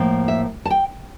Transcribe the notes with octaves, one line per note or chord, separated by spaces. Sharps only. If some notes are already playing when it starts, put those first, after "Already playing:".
Already playing: A2 F3 A#3
E5
A5
G5